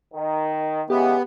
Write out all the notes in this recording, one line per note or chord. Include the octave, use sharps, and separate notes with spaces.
D#3
C#3 E3 G#3 B3 G4